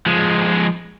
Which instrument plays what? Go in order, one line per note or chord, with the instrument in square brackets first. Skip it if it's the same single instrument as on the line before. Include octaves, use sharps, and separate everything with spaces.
[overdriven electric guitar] F3 G#3